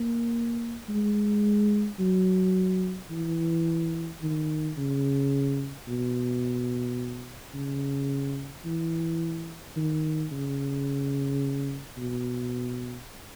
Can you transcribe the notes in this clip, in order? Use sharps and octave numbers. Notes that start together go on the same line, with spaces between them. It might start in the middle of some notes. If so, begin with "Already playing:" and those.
Already playing: A#3
G#3
F#3
E3
D#3
C#3
B2
C#3
E3
D#3
C#3
B2